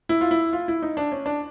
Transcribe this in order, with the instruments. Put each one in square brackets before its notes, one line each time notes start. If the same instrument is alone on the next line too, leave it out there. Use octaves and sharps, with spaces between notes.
[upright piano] E4
F4
E4
F4
E4
D#4
D4
C#4
D4